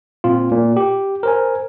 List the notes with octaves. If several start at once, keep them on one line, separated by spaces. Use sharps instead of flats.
A#2 C4 F4
A#2
G4
A#4 C5 G#5